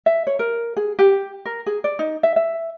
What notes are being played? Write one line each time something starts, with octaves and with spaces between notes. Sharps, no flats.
E5
C#5
A#4
G#4
G4
A#4
G#4
D5
D#4
E5
E5